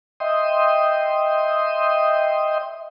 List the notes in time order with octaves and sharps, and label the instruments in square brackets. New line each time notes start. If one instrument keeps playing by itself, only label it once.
[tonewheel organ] D#5 E5 G5 C6 D#6